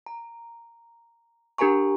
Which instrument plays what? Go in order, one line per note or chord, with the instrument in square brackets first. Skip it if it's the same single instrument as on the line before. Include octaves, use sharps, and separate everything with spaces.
[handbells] A#5
D4 G4 A#4 G#5 A#5 C#6